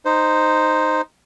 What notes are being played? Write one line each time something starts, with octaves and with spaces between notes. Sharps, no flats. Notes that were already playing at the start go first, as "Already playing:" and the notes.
D#4 C5